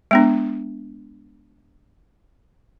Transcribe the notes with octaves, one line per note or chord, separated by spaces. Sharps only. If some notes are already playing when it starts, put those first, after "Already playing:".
G#3 B3 D4